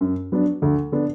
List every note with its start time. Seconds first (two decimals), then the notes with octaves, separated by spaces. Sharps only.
0.01 F#2
0.32 F#3 B3 D4
0.62 D2
0.92 D3 B3 D4